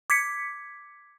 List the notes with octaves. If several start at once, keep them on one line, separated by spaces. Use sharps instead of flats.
D6 G#6 B6 C#7